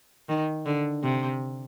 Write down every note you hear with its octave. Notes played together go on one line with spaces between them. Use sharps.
D#3
D3
C3